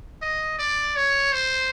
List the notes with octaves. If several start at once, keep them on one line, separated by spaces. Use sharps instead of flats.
D#5
D5
C#5
C5